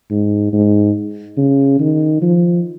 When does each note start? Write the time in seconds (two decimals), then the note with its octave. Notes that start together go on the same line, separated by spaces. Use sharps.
0.11 G#2
0.53 G#2
1.37 C#3
1.80 D#3
2.22 F3